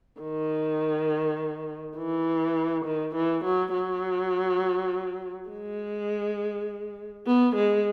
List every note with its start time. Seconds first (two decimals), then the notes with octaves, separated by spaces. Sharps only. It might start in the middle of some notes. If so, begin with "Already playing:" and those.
0.21 D#3
1.97 E3
2.85 D#3
3.15 E3
3.44 F#3
3.74 F#3
5.50 G#3
7.27 B3
7.56 G#3